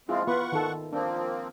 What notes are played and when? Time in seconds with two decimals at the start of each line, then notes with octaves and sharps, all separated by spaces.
0.09 F3 G#3 C4 E4 F4 G#4
0.27 B3 F4 B4 F#5 C#6
0.52 D#3 A4
0.93 F3 A#3 C4 D4